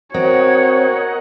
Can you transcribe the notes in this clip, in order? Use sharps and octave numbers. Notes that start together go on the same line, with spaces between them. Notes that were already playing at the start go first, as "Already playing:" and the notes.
C4 F#4 A#4 C#5 D#5 F#5